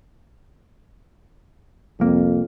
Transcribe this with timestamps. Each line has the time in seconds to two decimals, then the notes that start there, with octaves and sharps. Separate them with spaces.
2.00 C2 F2 A#3